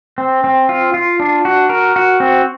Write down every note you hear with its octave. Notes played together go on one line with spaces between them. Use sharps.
C4
C4
F4
F4
D4
F#4
A#4
F#4
C4